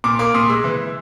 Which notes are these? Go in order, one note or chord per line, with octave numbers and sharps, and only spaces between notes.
A#2 D6
A#3 D6
A#2 D#6
G#3 E6
E3